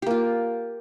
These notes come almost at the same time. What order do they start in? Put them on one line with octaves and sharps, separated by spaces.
G4 A#3 F4